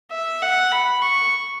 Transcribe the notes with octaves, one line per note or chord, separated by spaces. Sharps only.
E5
F#5
B5
C#6